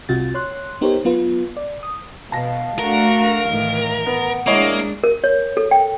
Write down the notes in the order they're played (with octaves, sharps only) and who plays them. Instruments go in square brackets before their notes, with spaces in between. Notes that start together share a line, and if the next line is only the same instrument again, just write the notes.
[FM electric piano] C2 C3 F4 F#4 A6
C#5 C6 F#6
B3 D#4 G4 A#4 C5 C#5
F#3 B3 F4 B4
D5
D#6
[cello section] B2 [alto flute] F5 [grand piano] A5 A#6
[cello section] A3 D4 F#4 [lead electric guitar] A#4
[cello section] A2 D#3 E3
[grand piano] B3 [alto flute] F#5
[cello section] G#3 D4 [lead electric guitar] A#3 [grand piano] E4 C#5 D#5
[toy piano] A#4
C#5
A4
G5